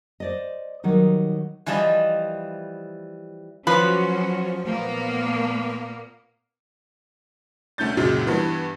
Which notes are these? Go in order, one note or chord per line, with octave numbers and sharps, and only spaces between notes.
C5 D5 D#5
D#3 F#3 G3 D#4
E3 F3 G3 E4 D#5
F3 F#3 C#4 F#4 B4
A#2 A#3 B3
D2 A3 C#4 G6 A6
C#2 F#2 A#2 C#3 F#3 G#3
G2 E3 B3